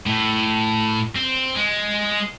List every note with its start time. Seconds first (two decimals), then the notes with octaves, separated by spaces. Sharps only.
0.07 A2
1.16 C4
1.56 G#3